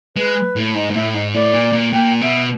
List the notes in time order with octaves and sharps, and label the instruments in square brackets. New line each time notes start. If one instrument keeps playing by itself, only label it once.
[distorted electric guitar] G#3 [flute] B4
[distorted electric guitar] A2
[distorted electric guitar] G#2 [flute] D#5
[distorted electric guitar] G#2
[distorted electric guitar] A2 [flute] E5
[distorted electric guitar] G#2 [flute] D#5
[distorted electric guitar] A2 [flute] D5
[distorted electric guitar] A#2
A#2
[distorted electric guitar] A#2 [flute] G5
[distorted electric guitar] B2 [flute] E5